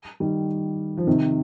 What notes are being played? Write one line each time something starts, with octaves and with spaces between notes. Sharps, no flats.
D#3 G3
F3
C3 D#3